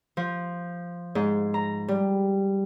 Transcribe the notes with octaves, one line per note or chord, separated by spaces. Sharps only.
F3
G#2
A#5
G3